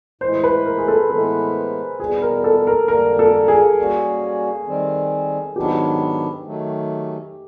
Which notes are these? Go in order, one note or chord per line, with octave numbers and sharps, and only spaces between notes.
A2 E3 G#3 C5
B4
A#4
G#4
A4
A2 E3 G#3 B3 A4
E2 B2 G3 B3 G#4
A#4
A4
A#4
F2 D3 G3 A#3 A#4
A4
G#4
G3 A#3 C#4 F#4
D#3 G3 C4
G#2 D#3 F#3 B3 D4 G4
D#3 F#3 A3